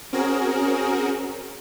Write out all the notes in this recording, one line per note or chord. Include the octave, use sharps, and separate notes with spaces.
C4 C#4 F#4 G#4 A#4